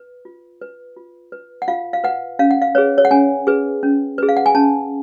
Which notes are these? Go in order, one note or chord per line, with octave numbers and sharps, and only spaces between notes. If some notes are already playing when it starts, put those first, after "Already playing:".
Already playing: B4
F4
B4
F4
B4
F#5
F4 F5
F5
B4 F#5
C#4 F5
F#5
F5
G#4 B4 C#5
C#5
F#5
C#4 G#5
G#4 B4
C#4
G#4 B4
F5
F#5
G#5
C#4 A5